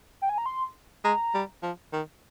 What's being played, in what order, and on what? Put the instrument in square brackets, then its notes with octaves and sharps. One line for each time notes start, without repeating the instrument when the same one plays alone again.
[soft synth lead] G5
G#5
A#5
C6
[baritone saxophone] G#3 [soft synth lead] A#5
[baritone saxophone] G3
F3
D#3